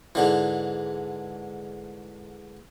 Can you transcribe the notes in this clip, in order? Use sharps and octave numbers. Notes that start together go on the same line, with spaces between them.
G#2 D3 E3